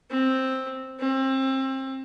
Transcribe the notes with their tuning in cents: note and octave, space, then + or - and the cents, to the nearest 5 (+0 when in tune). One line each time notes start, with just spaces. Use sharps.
C4 +5
C4 +30